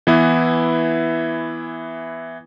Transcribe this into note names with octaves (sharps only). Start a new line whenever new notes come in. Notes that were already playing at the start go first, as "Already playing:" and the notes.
E3 B3 E4